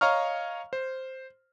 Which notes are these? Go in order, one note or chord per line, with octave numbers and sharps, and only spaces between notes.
C#5 D#5 F5 A#5 C#6 F6
C5